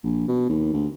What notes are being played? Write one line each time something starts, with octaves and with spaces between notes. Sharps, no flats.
A#1
B2
D#2
D2